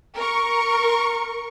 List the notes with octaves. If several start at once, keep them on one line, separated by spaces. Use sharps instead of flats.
A#4 C#6